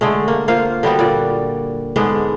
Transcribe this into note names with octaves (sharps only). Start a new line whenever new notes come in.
D3 G#3 A3
A#3
A#3 F4 C5 F5
D3 G3 B3 F#4
A#2 D5
G#2 D3 G#3 B3